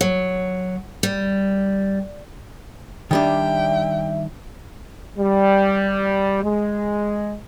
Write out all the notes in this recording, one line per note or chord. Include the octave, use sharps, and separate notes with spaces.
F#3
G3
D#3 G3 D4 E5 G5
G3
G#3